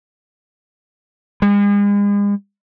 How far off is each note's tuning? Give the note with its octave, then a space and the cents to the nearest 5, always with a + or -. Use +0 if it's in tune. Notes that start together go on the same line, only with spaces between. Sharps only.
G#3 -40